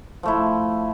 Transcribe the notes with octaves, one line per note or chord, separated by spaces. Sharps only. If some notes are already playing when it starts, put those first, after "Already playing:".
F3 A3 E4